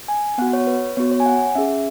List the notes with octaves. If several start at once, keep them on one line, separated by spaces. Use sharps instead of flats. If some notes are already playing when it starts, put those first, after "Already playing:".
G#5
B3 F#4 F#5
C#5
B4
B3 F#4 C#5
C#5
G#5
F#5
C#4 G#4 E5